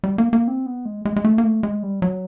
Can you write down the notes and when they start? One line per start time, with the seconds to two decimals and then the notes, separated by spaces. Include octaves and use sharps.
0.04 G3
0.18 A#3
0.33 A#3
0.48 C4
0.66 B3
0.85 G#3
1.05 G#3
1.16 G#3
1.25 A3
1.38 A#3
1.44 A3
1.63 G#3
1.83 G3
2.02 F#3